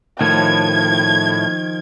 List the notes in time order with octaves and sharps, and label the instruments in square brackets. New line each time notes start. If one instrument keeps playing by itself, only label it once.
[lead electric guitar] A2 [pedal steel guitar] D#3 F3 [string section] G#6